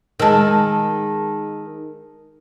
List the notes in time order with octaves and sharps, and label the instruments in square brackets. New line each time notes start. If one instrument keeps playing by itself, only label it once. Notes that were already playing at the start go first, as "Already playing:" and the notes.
[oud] D#3 G#3 [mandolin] A5 E6